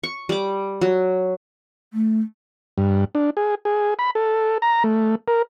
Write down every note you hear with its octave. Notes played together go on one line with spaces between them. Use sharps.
C#6
G3 D6
F#3
A3
G2
D4
G#4
G#4
B5
A4
A#5
A3
A#4